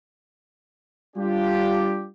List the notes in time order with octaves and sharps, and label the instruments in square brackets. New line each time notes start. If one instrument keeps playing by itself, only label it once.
[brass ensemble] G3 D4 F4 G4